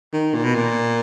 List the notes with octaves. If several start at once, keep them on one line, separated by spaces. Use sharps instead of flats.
D#3
A#2
B2
A#2